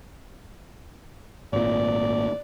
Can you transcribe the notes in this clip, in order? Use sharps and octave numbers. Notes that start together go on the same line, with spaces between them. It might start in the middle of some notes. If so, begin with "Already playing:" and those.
G#1 A#2 D5